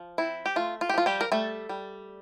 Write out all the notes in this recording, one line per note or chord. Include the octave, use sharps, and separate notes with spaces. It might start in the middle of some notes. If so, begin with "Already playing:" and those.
Already playing: F3
C4 E4
G4
A3 F4
F4
G4
F3 F4
G3 G4
A#4
G3 A3 A4
G3